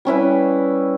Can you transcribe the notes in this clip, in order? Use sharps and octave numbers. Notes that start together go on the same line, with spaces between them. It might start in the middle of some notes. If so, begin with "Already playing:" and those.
G3 C#4 E4 B4